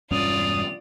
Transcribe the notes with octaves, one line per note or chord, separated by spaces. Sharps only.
E1 G2 C#4 F4 D5 D#6 F7